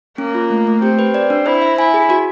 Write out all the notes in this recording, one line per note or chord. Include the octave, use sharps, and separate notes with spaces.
A#3 C#4
F4
A3
A3
C4 G4
B4
D5
D4
E4 C5
E5
E4 G#5
G#4
F#4